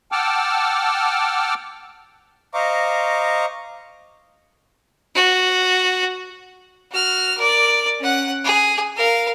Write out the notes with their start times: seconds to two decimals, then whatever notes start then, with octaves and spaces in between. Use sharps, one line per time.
0.12 F#5 G5 A5 D6 E6 F6
2.53 C5 D#5 F5 A#5 C#6 D6
5.15 F#4
6.91 F#4 F6
7.38 A#4 D5
7.99 C#4 F#5
8.44 G#4
8.96 A#4 F5